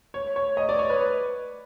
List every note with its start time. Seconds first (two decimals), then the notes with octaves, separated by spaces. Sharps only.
0.14 C#5
0.36 C#5
0.57 D#5
0.69 D5
0.79 C#5
0.90 B4